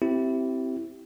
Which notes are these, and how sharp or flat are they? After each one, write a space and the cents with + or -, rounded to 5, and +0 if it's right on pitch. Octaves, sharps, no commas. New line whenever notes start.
C4 +0 E4 +0 G4 -25